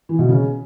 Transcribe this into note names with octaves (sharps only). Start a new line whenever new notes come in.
E3
B2
C#3